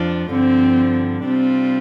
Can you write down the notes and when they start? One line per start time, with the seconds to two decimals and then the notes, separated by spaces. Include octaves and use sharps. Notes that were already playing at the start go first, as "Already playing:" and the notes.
Already playing: F2 F3 D4 F4
0.31 G2 D3 F3 C4
1.25 C3 G3 C4 D4 F4